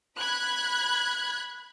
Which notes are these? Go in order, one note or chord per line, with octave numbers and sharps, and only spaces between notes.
B5 F#6 G#6